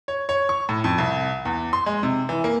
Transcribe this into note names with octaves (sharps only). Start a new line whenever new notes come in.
C#5
C#5
C#6
A2
F2
C2
E2
C6
G#3
C3
E3
A#3